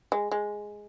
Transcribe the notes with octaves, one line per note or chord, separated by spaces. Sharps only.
G#3
G#3